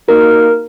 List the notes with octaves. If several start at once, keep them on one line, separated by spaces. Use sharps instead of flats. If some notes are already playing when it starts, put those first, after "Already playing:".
A#3 D#4 F#4 A#4